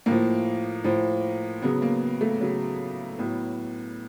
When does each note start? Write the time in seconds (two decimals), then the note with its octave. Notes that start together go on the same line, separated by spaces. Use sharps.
0.06 A2 F3 A#3
0.84 A2 F3
1.62 C#3 F#3 B3
1.82 A#3
2.21 A3
2.41 C#3 F#3
3.18 A2 F#3 B3